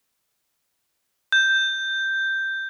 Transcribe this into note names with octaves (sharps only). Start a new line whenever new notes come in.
G6